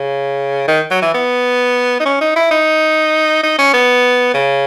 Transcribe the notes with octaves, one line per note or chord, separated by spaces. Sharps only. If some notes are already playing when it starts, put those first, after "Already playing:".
Already playing: C#3
D#3
F#3
E3
B3
D#4
C#4
D#4
E4
D#4
D#4
C#4
B3
C#3